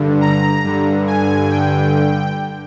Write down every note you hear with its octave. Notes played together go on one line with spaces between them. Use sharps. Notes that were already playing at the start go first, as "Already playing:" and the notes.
Already playing: G2 D3
A#5
G2 D3
G#5
G5